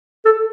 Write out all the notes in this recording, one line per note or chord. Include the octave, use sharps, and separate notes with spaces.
A4